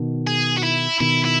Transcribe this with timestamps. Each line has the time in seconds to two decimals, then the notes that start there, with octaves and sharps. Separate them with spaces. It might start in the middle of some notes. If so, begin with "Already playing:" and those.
Already playing: B2 D#3
0.27 G#4
0.58 F#4
0.64 E4
1.00 B2 D#3 E4
1.25 E4